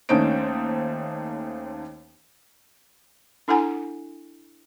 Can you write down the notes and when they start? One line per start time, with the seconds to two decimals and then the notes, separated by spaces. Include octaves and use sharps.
0.09 D#2 A3 C#4 D#4 C5 D7
3.48 D4 E4 A4 F#5 G#5 A#5